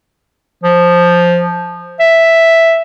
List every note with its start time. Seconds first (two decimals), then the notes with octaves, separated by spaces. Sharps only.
0.64 F3
2.00 E5